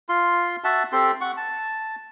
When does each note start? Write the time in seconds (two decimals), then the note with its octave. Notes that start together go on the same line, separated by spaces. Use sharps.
0.09 F4 C6
0.64 F#4 E5 F#5 A5
0.92 C4 G4 A4 C6
1.21 F#5 C#6
1.37 A5